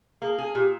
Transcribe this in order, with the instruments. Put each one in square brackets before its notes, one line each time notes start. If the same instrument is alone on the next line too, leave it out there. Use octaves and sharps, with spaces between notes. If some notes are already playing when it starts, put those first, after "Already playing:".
[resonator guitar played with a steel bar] A#3 [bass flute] G#4
[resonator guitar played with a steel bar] G#4
[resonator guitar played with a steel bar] A#2 [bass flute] G4